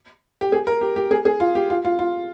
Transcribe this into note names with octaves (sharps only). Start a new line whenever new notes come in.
G4
G#4
A#4
G4
G4
G#4
G#4
F4
G4
F4
F4
F4